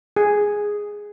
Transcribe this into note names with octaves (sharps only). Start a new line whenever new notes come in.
G#4